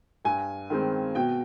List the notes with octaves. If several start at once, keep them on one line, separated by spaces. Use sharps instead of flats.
G2 G#5
D#3 G#3 C4
B2 G5